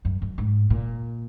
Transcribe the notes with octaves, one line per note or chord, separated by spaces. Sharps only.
F#2
F#2
G#2
A#2